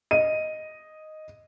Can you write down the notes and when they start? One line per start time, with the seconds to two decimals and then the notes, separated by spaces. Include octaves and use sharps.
0.11 D#5 D#7